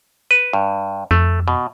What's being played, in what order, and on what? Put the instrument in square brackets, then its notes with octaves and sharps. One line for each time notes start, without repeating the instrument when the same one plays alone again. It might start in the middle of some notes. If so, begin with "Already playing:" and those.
[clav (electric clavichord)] B4
G2
[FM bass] F2 [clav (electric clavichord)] A3
[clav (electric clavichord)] B2